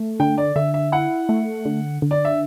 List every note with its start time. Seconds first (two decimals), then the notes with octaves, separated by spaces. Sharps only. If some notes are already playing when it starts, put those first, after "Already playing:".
Already playing: A3
0.20 D3 G5
0.38 D5
0.56 D3 E5
0.74 E5
0.92 E4 F#5
1.29 A3
1.65 D3
2.02 D3
2.11 D5
2.25 E5